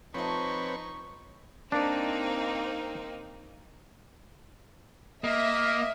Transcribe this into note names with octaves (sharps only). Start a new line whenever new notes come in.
F3 C4 D#4 B4 C#5 D#5 C#6
A#3 C4 D4 D#4
A#3 D#5 E5